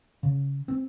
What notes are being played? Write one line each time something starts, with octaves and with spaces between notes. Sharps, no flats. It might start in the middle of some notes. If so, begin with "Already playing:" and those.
C#3
C4